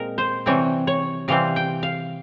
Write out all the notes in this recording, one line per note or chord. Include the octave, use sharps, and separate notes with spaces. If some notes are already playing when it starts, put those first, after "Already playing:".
Already playing: A#2 G#3 C4 A#4
C5
C3 E3 G3 C4 C#5
C#5
C3 E3 G3 C4 F5
G5
F5